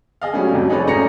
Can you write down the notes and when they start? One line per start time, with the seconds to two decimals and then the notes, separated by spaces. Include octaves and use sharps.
0.22 G#4 D#5 F5
0.34 A2 F#3 G3 C#4
0.53 F2 C3 F#3
0.70 D#4 G#4 A4 B4 C#5 D5
0.86 G#1 A3 C#4 A#5 A#6 C#7